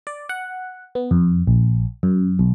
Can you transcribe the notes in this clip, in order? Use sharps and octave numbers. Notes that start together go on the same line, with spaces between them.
D5
F#5
B3
F2
A#1
F#2
B1